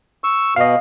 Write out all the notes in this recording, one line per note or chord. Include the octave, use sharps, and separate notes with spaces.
C#6 E6
B2 D#5 F5